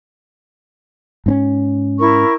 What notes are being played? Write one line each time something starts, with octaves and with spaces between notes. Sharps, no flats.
G#2 C4 C#4
E4 A#4 C#6